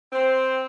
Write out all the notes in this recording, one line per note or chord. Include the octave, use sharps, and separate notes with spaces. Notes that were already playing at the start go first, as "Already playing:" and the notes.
C4